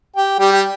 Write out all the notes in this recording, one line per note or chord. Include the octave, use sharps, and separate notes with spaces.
G4 G5
G3 G4
G4